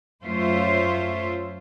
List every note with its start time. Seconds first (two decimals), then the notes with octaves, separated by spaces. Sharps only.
0.22 F#2 A3 F4 C5 C#5 E5